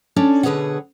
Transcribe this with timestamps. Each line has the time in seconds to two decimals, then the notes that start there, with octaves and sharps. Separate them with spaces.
0.16 C#4 D4 A4 C#5 D5
0.43 B2 D3 G#4 B4 C#5 F#5